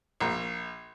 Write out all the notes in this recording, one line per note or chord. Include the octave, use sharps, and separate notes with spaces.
A#1